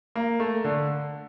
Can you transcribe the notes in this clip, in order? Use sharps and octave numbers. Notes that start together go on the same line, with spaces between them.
A#3
A3
D3